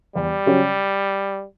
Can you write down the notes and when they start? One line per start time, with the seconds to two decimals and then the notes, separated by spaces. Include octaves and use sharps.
0.16 E2 G3
0.46 C#3 F#3 C#4 G4